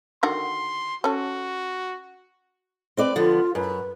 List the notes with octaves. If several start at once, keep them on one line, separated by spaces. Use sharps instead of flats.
D3 D#3 F#4 C6
C#4 F#4 A4
C4 B4 D5
D3 F3 B3 F4
F#2 B4